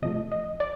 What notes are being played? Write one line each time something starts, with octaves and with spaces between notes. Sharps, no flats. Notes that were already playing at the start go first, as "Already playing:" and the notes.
C3 F3 A3 D#5
D#5
D5